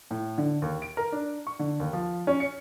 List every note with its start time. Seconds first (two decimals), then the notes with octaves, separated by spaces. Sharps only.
0.11 A2
0.38 D3
0.62 D#2
0.82 D7
0.97 A#4
1.12 D4
1.47 C#6
1.59 D3
1.80 D#2
1.93 F3
2.27 C#4
2.40 C#7